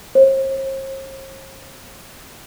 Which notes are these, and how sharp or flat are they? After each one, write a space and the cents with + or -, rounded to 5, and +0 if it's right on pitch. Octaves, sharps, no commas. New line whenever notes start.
C5 +45